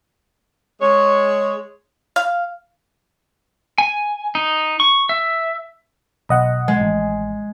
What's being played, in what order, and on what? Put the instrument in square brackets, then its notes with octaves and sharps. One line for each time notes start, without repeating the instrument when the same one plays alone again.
[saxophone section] G#3 C#5
[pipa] F5
[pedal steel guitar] G#5
D#4
C#6
E5
[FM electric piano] B1 D#5 F#5
[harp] G#3
[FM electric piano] A1